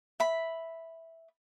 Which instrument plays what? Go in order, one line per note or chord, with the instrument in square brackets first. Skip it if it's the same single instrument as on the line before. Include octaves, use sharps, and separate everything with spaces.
[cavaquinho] E5 B5